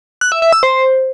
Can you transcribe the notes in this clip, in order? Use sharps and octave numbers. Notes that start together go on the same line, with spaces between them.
F#6
E5
E5
E6
C5